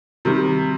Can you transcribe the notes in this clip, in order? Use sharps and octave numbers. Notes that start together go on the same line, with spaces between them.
C3 D#3 G3